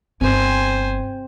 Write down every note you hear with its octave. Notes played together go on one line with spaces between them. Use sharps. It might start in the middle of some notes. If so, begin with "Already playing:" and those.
G1 C4 C5 G#5